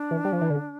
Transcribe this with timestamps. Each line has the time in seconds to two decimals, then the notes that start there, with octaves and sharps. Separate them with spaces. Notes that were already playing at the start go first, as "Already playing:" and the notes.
Already playing: D4
0.11 E3
0.25 G3
0.32 F3
0.41 E3
0.50 D3